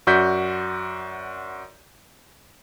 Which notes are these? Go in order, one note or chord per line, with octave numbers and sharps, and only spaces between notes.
F#2 F#4 D5 G6 B6